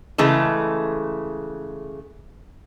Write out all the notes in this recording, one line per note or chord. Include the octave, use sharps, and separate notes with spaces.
C#3 E3 G#3 A3